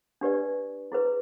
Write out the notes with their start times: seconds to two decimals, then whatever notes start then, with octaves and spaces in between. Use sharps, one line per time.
0.21 D4 G4 B4 D5
0.92 E4 G#4 B4